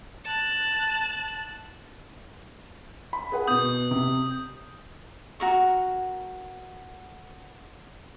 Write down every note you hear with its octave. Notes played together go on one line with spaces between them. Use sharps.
A5 F#6
B5
G#4 B4 F#5
B2 B3 D#6 G6
C3
F#4 A#4 C#6